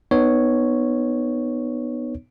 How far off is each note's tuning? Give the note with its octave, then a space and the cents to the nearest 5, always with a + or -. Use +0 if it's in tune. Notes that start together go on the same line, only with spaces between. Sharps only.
B3 +0 D#4 -25 C#5 +0